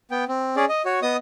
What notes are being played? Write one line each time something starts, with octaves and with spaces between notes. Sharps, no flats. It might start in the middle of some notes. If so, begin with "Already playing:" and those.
B3 G5
C4
C#4 G#4 D5
D#5
F#4 C#5
B3 D#5 D#6